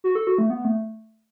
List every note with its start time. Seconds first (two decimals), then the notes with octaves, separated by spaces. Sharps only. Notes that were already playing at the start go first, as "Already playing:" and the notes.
0.04 F#4
0.15 A4
0.27 F#4
0.38 A3
0.50 B3
0.65 A3